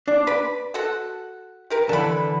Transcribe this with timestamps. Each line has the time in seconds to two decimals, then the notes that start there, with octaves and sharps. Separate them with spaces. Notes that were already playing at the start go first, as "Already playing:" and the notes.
0.08 D4
0.27 B4 D5 B5
0.74 F#4 A4 F#5
1.70 G4 A#4 B4
1.89 D3 E3 A5 B5